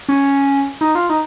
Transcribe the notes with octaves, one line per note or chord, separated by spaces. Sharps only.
C#4
D#4
F4
D#4